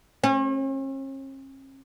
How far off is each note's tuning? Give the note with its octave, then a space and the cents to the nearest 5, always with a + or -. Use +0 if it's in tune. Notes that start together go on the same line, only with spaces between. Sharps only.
C#4 -45